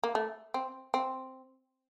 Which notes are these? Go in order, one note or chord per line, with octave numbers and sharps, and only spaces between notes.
A#3
A3
C4
C4